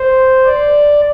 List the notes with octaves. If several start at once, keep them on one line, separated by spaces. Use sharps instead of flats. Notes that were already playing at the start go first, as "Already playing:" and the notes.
Already playing: C5
D5